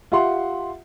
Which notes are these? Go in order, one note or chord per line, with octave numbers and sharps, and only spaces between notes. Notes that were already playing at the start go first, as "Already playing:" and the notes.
F4 G4 E5 F#5 C6